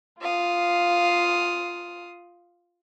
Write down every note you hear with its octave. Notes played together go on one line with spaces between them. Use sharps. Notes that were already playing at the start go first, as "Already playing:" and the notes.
F4 F5 D#6